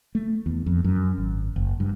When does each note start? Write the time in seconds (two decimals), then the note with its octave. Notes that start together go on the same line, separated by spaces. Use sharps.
0.15 A3
0.46 E2
0.66 F2
0.84 F#2
1.18 G#1
1.56 F#1
1.80 G2